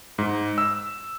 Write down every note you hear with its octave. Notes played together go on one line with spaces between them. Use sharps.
G#2
E6